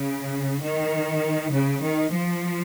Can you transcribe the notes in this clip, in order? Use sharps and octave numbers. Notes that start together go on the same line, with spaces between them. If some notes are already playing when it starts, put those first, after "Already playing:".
Already playing: C#3
D#3
C#3
D#3
F3